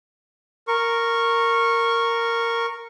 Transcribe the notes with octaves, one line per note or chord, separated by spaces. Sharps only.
A#4 C#6